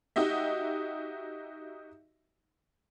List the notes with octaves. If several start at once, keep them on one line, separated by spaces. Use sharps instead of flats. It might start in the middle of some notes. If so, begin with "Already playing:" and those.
D#4 F#4 G4 D#5 E5